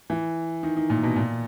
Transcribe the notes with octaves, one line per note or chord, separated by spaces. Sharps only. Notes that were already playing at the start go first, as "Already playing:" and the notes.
E3
D#3
D#3
A#2
B2
A#2